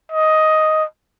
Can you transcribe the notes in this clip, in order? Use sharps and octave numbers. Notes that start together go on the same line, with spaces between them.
D#5